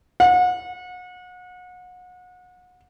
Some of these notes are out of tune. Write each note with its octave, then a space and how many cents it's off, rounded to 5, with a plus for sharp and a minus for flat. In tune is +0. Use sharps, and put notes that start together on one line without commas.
F#5 -35